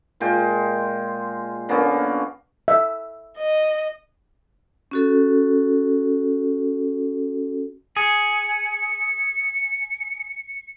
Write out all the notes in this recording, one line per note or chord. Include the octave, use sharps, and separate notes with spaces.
A#2 G#3 F4 G5
D3 A#3 B3 C#4
E5
D#5
C#4 F#4 A4
G#4 C#7